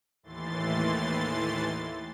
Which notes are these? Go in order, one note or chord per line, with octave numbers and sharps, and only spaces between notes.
D#2 A2 E3 C6 A6